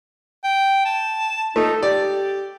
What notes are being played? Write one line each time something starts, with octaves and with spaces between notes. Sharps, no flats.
G5
A5
A3 D#4
G4 D5